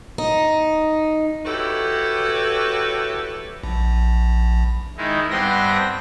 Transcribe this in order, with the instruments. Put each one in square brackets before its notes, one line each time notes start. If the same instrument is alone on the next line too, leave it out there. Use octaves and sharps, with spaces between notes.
[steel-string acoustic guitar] D#4
[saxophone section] E4 F#4 G4 A4 B4 C#5
[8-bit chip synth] A#1
[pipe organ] D#3 G#3 D#4 E4
G2 B3 C4 G5 C6 A#6